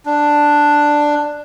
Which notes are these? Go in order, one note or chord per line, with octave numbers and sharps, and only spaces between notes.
D4